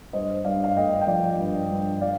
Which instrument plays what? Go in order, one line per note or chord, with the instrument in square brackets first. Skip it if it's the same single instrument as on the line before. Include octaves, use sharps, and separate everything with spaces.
[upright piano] G2 C5 D#5
G2 D5 F5
F5
A3 D#5 G5
G5
F3 D5 F5
G2
G2
D5 F5